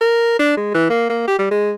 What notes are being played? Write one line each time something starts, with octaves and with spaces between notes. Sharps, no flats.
A#4
D4
G#3
E3
A#3
A#3
G4
G3
G#3